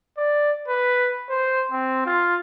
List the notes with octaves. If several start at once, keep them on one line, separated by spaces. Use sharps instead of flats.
D5
B4
C5
C4
F4